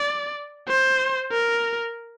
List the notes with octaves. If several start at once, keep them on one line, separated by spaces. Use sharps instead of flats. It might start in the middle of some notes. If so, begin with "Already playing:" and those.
Already playing: D5
C5
A#4